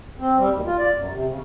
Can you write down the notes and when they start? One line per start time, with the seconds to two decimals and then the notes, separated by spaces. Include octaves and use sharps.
0.19 C4
0.38 G3
0.53 D#2
0.65 F4
0.78 D5
0.95 F#2
1.10 C3
1.28 C#3